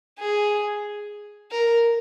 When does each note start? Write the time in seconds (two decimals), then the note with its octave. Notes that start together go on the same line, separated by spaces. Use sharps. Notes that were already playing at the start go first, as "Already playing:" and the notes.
0.19 G#4
1.51 A#4